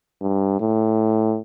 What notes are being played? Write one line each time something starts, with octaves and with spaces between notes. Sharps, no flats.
G2
A2